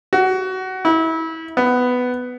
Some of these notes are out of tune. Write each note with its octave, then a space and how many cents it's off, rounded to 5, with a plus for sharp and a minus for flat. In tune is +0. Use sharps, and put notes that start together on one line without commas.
F#4 +20
E4 -30
B3 +10